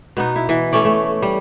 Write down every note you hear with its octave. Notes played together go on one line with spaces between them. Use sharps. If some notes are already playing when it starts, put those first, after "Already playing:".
B2 B3 D#4
E4
E3
A3 C#4 D5
A3
G3